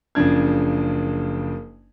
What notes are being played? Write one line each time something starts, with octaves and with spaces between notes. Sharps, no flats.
F#1 C#3 F3 D4 G#6